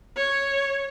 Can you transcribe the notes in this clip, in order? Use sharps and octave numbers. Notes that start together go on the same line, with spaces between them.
C#5